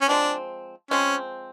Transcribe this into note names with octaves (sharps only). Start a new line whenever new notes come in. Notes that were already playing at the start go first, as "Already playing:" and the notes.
C#4
F3 G#3 C4 D4
F3 G#3 C4 C#4